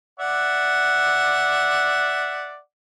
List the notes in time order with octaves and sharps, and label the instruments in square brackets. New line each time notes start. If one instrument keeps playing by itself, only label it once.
[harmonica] D5 E5 F#5